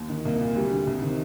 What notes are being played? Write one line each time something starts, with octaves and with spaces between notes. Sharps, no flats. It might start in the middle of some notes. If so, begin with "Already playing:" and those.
Already playing: D#2
D#3
C2 A#3
A#2
D2 G3
D3
C2
C3 D#3